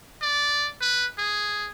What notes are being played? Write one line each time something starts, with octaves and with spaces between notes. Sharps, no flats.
D5
B4
G#4